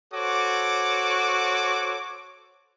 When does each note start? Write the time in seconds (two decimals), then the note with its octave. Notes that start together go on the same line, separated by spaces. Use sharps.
0.14 F#4 A4 C5 C#5 D6